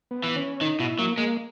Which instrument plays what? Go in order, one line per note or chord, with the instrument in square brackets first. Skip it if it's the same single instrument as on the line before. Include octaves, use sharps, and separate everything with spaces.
[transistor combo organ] B3
[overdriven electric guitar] E3
[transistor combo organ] C#4
[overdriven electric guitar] D#3 [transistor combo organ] D#4
[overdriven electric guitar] B2 [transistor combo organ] E4
[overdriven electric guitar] F#3 [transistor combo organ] A#3
[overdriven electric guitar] G#3 [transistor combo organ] A#3